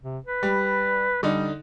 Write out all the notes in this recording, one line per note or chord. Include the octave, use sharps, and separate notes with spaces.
C3
B4
G3
D3 G3 D#4